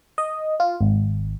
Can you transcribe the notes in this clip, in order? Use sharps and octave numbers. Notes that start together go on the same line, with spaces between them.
D#5
F4
G#1